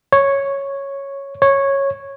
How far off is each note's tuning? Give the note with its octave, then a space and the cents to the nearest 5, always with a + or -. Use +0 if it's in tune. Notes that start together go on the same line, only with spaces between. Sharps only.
C#5 -5
C#5 -10